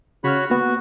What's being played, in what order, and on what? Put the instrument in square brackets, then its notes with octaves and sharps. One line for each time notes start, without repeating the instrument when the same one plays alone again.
[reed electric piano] C#3 F6 [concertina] F#4 C#5 B5
[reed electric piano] A#3 B3 [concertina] F#4